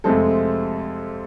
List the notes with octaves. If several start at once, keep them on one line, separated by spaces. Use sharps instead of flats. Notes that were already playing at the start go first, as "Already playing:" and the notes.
F2 C3 G#3 A3 C4 A4